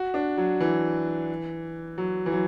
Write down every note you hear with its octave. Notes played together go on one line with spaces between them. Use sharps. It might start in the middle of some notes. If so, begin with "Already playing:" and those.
Already playing: F#4
D4
F#3
E3
F#3
E3
F#3